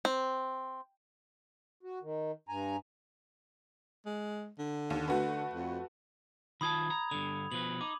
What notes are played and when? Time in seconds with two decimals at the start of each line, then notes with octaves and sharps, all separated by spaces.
0.05 C4
1.83 F#4
2.02 D#3
2.49 G2 G#5 A#5
4.06 G#3
4.59 D3
4.90 D#2
5.08 D3 A3 F#4 B4
5.53 F2
6.61 D#3 F4 A5 B5 D#6 G#6
6.90 A#5
7.11 G2 D3 F7
7.52 B2 F3 B4 F#7
7.81 D#4 D6